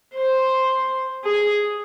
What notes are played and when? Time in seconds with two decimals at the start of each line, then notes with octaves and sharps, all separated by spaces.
0.15 C5
1.24 G#4